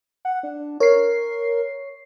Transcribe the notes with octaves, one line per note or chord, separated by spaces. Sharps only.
F#5
D4
A#4 C#5 C7